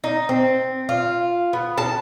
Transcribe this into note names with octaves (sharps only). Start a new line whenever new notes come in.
D#4
C4
F4
B3
A5